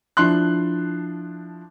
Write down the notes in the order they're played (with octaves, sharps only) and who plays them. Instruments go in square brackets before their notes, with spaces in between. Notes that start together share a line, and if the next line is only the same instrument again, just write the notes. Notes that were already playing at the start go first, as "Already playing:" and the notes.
[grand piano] F3 D4 E4 C6 F#6